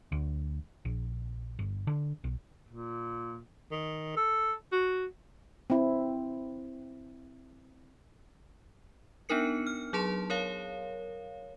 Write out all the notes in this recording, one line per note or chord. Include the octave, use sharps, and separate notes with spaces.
D2
A#1
G1
D3
B1
A#2
D#3
A4
F#4
C4 E4
B3 D4 D#4 A#4 C#7
F6
F#3 G#4 A5 C6
A#4 C#5 F5